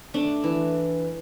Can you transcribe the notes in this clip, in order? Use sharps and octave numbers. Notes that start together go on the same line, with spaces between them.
A3 D4
E3